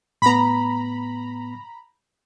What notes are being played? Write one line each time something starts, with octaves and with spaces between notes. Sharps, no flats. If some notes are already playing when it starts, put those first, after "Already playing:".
A2 B3 A#5 B5